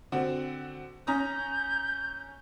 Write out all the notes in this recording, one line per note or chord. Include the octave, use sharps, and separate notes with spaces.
D3 C4 F#4
C#4 A#5 D#6 G6